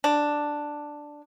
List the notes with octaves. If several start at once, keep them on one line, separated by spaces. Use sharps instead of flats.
D4